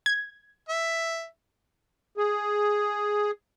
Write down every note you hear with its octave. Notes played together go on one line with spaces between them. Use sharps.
G#6
E5
G#4